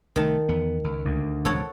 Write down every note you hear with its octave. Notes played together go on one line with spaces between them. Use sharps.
C2 D#3 G3 A3 A5
E2 B3
C#2
D2 D3
E1 C#2 G#2 A4 C#5 F#5